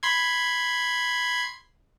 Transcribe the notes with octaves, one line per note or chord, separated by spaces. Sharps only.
B5 C6 G#6